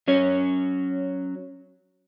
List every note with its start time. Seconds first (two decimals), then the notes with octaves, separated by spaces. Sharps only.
0.08 F#3 C#4 C#5